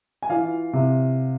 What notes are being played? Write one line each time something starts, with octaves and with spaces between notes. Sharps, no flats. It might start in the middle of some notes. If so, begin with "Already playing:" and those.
G#5
E3 F4 F5
C3